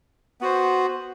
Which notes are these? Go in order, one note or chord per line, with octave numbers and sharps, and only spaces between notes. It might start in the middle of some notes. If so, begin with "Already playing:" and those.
B3 F#4 C5